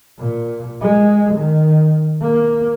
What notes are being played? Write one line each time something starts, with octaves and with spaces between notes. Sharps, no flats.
A#2
G#3
D#3
A#3